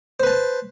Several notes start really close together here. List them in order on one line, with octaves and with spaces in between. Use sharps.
C5 B4 A5